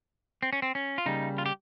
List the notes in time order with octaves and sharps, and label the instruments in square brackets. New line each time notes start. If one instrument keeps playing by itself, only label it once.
[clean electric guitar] C4
C#4
C4
C#4
F4
C#3 G3 A#3 D#4
F4
G4